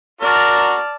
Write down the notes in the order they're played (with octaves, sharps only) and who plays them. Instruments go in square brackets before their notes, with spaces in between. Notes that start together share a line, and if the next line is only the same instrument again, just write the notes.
[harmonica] D4 F#4 A#4 [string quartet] D5 A5 F6